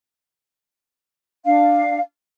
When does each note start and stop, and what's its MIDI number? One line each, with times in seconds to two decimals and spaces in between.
1.45 1.99 62
1.45 1.99 77